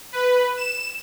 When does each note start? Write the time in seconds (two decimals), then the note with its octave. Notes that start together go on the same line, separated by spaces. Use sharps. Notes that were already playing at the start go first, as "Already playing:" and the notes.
0.12 B4
0.57 E7